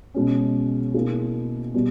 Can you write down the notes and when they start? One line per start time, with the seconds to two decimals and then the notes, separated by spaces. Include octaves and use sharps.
0.14 B2 G#3 C#4
0.94 B2 A#3 E4 G#4
1.74 B2 G3 B3